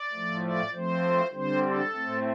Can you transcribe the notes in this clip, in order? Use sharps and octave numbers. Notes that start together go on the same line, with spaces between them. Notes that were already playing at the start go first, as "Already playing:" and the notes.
Already playing: D5
A2 F3 A3
D5
F3 A3 C4 C5
D3 G3 C4 C5
A4
A2 A3 C4